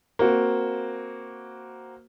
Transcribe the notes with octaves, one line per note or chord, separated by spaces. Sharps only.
A#3 C4 F#4